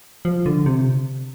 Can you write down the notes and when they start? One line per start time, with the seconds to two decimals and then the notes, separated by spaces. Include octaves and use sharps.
0.25 F3
0.46 D3
0.66 C3